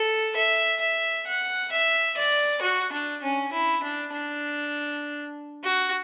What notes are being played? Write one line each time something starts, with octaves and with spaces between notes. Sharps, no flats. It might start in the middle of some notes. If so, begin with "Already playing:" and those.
Already playing: A4
E5
E5
F#5
E5
D5
F#4
D4
C#4
E4
D4
D4
F#4